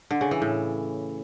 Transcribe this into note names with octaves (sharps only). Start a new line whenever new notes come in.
D3
C#3
E3
A2